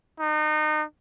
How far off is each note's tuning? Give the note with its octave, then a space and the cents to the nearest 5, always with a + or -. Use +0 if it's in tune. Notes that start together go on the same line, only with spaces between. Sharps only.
D#4 -30